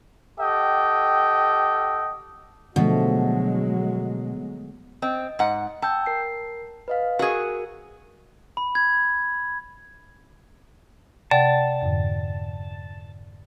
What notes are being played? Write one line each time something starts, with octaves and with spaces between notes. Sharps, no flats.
G4 A4 D#5 F#5 G5
B2 D3 F3 F#3 G#3 A3
C4 D#5
G#2 F#5
G5 A5 E6 G6
A#4 C7
B4 D#5 F5
F#4 G#4 A#4
B5
G#6
C3 D5 F#5 G5 A5
F2 G#2 D3